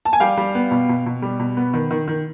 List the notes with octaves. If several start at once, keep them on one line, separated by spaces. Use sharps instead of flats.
A5
G#5
G3 F5 G5
G3
B3
B2
B2
B2
G3
B2
B3
D#3
D#3
D#3